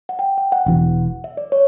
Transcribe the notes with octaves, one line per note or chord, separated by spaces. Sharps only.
F#5
G5
F#5
F#5
E1 E2 B2 F#5
E5
D5
C#5